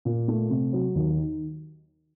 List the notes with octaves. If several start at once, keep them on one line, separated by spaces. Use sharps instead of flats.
A#2
A3
C3
F#3
D#2
D#3